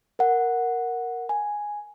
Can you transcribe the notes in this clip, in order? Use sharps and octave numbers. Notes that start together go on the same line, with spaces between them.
A#4 F#5
G#5